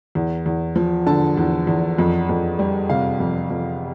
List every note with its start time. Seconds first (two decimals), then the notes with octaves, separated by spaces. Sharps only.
0.15 E2
0.46 E2
0.76 F3
1.07 D3 A5
1.37 E2
1.67 E2
1.98 F2
2.29 F2
2.59 G3
2.89 C3 F5
3.20 F2
3.50 F2